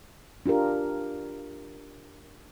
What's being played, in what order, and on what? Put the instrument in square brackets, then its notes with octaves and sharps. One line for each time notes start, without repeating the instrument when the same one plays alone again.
[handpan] D4 F4 G4 A#4